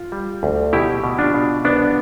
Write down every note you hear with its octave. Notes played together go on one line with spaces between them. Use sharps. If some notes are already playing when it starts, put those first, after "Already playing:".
Already playing: F4
G3
D2
B2 E4 G4
B2
D4 F4
B2
C2 B3 D4